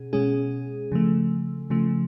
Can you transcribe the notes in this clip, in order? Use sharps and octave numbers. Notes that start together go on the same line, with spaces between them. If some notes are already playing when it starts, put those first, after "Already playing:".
Already playing: B2 C#4 G#4
B2 G#3 C#4 G#4
C#3 F3 A3
C#3 F3 A3